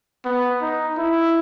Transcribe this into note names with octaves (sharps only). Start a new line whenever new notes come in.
B3
D#4
E4